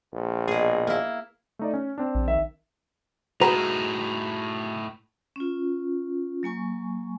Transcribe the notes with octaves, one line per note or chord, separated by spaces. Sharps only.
A#1
B2 G#4
A#3 E4
A3 D#4 D5
C#4
C4 D4
A#1
D#3 E5
A2 D#4 F#4 G#4 B4 A#5
C#4 F4
F#3 A#3 G#5 C#6